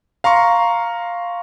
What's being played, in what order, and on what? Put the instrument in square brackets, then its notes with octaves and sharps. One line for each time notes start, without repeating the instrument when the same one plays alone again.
[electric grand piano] F5 A#5 C6 C#6